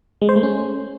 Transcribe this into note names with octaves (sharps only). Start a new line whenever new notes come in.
G#3
C5
A3
C#4